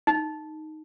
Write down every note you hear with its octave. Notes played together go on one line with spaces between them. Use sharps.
D#4